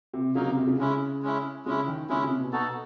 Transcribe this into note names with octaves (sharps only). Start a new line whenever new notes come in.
C3
C#3 F#3 A#3 D#4
C3
C3
C#3
C#3 G#3 C#4 E4
G#3 C#4 E4
C#3 G#3 C#4 E4
D#3
C#3 G#3 C#4 E4
C3
B2
B2 D#4 F#4 A4